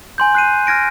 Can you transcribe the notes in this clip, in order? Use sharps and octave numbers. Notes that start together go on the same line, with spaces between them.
G#5 C6 G6
F#6 C7 D#7
F6 G#6 A#6 D7